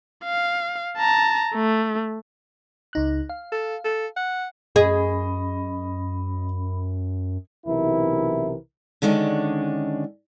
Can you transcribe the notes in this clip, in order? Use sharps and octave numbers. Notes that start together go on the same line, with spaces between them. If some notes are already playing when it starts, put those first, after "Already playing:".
F5
A5 A#5
A3
C#2 D#4 F#6
F5
A4
A4
F#5
F#2 C#4 G#4 D#5 B5
B1 C3 E3 E4 A#4
D3 D#3 G#3 C#4 D4